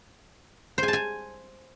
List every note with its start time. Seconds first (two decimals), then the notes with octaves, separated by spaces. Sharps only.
0.78 C5
0.83 G#5
0.88 A5
0.93 G#5